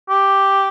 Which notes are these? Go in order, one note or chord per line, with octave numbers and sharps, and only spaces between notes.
G4